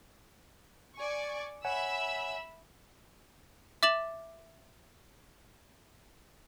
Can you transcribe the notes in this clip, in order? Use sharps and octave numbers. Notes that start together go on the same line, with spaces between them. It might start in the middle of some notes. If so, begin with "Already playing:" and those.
D5 G#5 C#6
C#5 E5 F#5 G#5 B5 E6
E5 D6 A6 E7 F#7